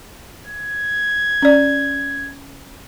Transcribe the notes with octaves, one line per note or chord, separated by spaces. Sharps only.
G#6
C#4 D5